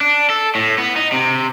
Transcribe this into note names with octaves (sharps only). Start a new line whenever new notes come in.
D4
A4
A2
B3
D#4
C3